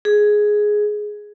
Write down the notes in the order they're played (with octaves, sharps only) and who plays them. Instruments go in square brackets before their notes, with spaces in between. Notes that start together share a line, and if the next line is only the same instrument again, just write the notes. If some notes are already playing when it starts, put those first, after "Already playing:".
[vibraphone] G#4